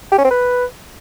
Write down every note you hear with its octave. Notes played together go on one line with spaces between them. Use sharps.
G4
C#4
C4
B4